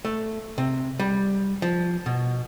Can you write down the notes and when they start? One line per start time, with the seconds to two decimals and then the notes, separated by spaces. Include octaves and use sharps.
0.05 A3
0.58 C3
0.99 G3
1.62 F3
2.06 B2